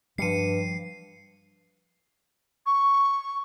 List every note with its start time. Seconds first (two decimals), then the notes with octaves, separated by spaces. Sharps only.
0.18 G2 F3 G3 C7 C#7 D#7
2.66 C#6